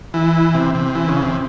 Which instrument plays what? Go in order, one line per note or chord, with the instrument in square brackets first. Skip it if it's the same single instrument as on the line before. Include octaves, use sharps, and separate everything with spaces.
[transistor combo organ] E3
C3
C3
E3
C#3
C3